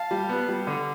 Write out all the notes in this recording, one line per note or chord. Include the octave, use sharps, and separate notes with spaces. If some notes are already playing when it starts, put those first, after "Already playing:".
Already playing: F5 A5
G3
B3
G3
D3